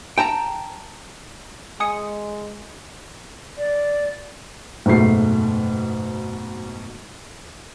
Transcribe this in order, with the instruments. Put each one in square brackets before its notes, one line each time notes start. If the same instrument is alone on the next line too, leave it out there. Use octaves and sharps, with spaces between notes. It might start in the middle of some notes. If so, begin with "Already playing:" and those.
[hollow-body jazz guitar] G5 A5 A#5
[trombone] G#3 [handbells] G#5 D#6 C#7
[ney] D5
[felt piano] F#1 G#2 B2 A3 C7